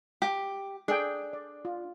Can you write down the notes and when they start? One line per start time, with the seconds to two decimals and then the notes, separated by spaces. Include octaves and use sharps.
0.22 G4
0.88 D4 G#4 A4 G5
1.33 D5
1.65 F4